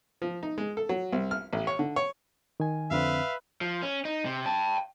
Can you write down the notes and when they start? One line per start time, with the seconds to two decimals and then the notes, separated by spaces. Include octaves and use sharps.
0.22 F3
0.43 D#4
0.58 G#3
0.77 A4
0.89 F#3
1.13 C2
1.31 F6
1.53 A1
1.67 C#5
1.79 D3
1.96 C#5
2.60 D#3 G#5
2.91 F2 D3 C4 B4 E5 F5
3.61 F3
3.82 C#4
4.05 D#4
4.26 C3
4.46 G5 A5